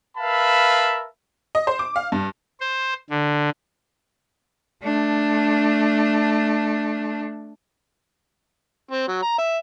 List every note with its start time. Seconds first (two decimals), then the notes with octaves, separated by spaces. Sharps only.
0.18 A#4 B4 E5 F5 A5 B5
1.55 D#5
1.67 C5
1.79 D6
1.96 F5
2.12 G2
2.60 C5
3.10 D3
4.83 A3 D4
8.91 C4
9.08 F#3
9.22 A#5
9.38 E5